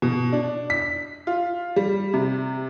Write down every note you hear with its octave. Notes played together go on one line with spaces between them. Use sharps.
B2
D4
B6
F4
G3
C3